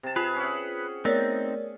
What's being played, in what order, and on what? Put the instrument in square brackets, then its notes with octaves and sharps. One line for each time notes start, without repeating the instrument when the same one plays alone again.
[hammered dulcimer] C3 A5
[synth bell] F4 [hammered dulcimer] G#4 [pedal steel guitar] B4
[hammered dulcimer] C#4 E5 F#5
[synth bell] A3 B3 D5 [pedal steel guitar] C4 D#4 [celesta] A#4 C#5